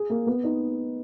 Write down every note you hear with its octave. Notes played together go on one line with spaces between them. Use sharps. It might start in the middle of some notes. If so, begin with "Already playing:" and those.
Already playing: G#4
A#3
B3
D#4